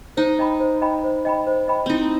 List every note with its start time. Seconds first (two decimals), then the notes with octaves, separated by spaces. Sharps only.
0.17 D#4 C5
0.39 D#5 G5 B5
0.60 C5
0.82 D#5 G5 B5
1.04 C5
1.25 D#5 G5 B5
1.47 C5
1.68 D#5 G5 B5
1.86 C4 D#4 E4